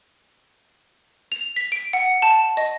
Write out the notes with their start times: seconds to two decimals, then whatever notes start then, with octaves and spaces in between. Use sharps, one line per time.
1.32 F7
1.56 B6
1.72 D7
1.93 F#5
2.22 A5
2.57 D#5